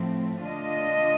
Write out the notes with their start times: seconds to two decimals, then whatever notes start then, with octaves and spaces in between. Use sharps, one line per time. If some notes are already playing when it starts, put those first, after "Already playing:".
Already playing: A2 F3 A3 C4
0.46 D3 A3 D4 F4 D#5